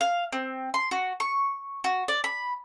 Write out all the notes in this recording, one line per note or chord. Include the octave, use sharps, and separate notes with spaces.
F5
C4
C6
F#4
C#6
F#4
D5
B5